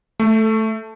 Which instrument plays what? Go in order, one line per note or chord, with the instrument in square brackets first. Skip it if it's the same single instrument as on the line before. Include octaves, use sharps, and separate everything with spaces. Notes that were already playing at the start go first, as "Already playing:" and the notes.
[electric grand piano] A3